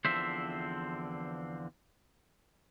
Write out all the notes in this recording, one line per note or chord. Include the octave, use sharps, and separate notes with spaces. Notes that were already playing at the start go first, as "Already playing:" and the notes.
E2 D3 F3 C4 C5 E5